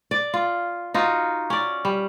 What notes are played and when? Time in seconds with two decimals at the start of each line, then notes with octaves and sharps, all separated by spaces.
0.11 D5
0.34 F4
0.94 D#4 F4 F#4
1.50 C#4 D5
1.85 G3